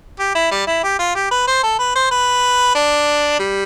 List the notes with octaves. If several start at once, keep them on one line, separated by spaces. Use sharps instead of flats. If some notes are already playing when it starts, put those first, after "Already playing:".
G4
E4
G3
E4
G4
F4
G4
B4
C5
A4
B4
C5
B4
D4
G3